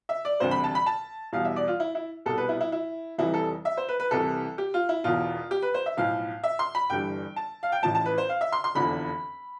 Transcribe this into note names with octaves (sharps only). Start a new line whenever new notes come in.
E5
D5
E1 D2 C3 G3 C5
B5
A5
B5
A5
E2 B2 G3 F5
E5
D5
F4
E4
E4
C2 B2 G3 A4
B4
E4
E4
E4
F1 F2 E3 G3 E4
A4
E5
C5
B4
B4
C2 C3 E3 A4
G4
F4
E4
E1 E2 B2 F4
G4
B4
C5
E5
B1 A2 F3 F5
E5
C6
B5
G1 G2 E3 G3 G5
A5
F5
G5
A1 A2 F3 A5
A5
B4
C5
F5
E5
C6
C6
F1 E2 D3 F3 B5